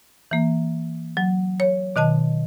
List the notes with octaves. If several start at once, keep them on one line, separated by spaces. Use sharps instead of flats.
E3 A#3
F#3
C#5
B2 D#3 D#5 A5